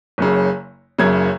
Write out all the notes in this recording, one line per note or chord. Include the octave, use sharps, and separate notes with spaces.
F#1 F#2 C#3
F#1 F#2 C#3 G#6